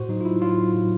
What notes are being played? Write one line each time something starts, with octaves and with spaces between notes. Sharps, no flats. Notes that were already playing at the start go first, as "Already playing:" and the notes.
Already playing: A2 F#4 C5
F#3 D#4
F4
E4
F#3 F4
A2